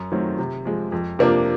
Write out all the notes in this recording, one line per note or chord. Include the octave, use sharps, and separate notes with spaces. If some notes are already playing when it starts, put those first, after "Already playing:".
Already playing: F#2
D#3 F#3 A3 C4
C3
F3 G#3
F2
C3 F3 A#3 D4